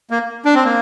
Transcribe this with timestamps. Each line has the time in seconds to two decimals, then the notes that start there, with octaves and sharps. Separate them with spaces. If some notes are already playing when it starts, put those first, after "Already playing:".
0.10 A#3
0.45 D4
0.55 C4
0.64 A#3